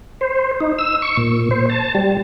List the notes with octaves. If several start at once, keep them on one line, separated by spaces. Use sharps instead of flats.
C5
D#4
E6
C#6
A#2
C5
A5
G3